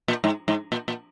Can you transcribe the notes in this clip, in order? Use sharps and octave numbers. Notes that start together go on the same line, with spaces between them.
A#2
G#2
G#2
A#2
A#2